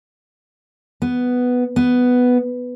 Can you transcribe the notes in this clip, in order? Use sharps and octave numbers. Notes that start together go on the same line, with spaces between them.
B3
B3